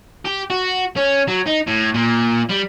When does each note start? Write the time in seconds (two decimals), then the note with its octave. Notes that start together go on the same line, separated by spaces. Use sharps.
0.25 G4
0.50 F#4
0.97 C#4
1.28 F#3
1.47 D#4
1.67 A2
1.95 A#2
2.50 G3